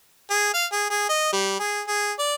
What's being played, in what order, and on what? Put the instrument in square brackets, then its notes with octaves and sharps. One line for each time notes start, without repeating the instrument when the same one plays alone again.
[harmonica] G#4
F5
G#4
G#4
D#5
G3
G#4
G#4
D5